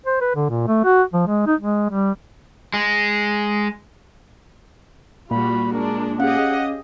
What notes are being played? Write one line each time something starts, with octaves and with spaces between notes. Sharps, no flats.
C5
B4
D3
A#2
A3
F#4
F3
G#3
D#4
G#3
G3
G#3
A#2 G3 F4 F#4 B5
G#3 D4 A#4
C#4 G4 G#4 D#5 F5 F#5